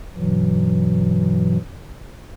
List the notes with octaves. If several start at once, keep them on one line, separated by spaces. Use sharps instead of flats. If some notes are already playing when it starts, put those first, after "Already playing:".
G2 B2 E3 F#3